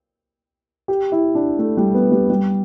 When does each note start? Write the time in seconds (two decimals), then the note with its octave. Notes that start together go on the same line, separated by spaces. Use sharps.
0.88 G4
1.12 E4
1.35 D4
1.59 A3
1.77 G3
1.94 B3
2.12 G3
2.30 G3